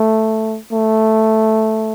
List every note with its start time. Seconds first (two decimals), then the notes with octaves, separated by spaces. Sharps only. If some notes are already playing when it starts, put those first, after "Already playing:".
Already playing: A3
0.72 A3